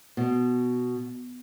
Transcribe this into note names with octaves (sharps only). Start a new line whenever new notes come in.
B2